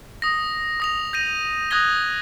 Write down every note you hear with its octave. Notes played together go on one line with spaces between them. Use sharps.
D#6 A#6
D#6 A#6 F7
G6 A#6 D#7
D#6 F#6 G#6 A#6 G7